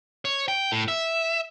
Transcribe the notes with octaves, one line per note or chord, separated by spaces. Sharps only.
C#5
G5
A2
E5